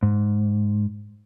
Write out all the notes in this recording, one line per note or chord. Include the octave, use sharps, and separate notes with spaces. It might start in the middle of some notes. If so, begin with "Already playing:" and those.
G#2